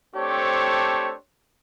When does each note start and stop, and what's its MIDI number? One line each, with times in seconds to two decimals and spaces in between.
0.16 1.14 57
0.16 1.14 60
0.16 1.14 62
0.16 1.14 67
0.16 1.14 72
0.16 1.14 73